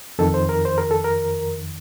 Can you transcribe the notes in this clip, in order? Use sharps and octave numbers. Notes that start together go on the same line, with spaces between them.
F2 D#3 A4
C5
A#4
C5
A#4
A4
A#4